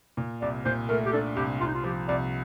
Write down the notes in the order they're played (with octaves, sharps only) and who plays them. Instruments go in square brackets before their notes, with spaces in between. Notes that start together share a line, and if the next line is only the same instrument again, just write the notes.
[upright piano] A#2
[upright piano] C2 [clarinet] D5
[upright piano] A#2 [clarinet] C5
[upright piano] A3 [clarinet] A#4
[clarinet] G4
[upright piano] D4 [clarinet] A4
[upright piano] C2 [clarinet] G4
[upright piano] C2 [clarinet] F4
[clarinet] D#4
F4
[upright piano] F3 [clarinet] G4
[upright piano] C2 [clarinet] D5